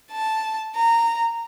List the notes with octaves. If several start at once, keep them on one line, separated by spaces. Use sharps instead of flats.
A5
A#5